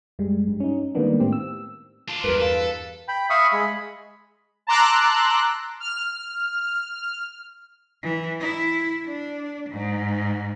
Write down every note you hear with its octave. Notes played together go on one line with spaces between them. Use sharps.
F#2 G3 G#3
G2
C#4 D#4
D#3 G3 G#3 A#3 B3 D4
A2 C4 G4
E6
D4 F4
E2 G2 A#4 B4
A4 F5
G5 B5
E5 F5 B5 C#6 D#6
G#3 B5
A5 A#5 C6 D6 E6 F#6
F6
E3
E4
D4
G#2